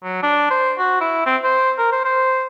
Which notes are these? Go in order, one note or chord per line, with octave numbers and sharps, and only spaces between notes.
F#3
D4
C5
F#4
E4
C4
C5
A#4
C5
C5